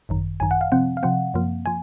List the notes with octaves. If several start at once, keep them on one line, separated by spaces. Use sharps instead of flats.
G#1 F#2 D#3
G#1 F#2 D#3 G#5
F#5
F5
C3 F3 C4 F#5
F5
C3 F3 C4 F#5
F#2 F3 A#3
F3 G#5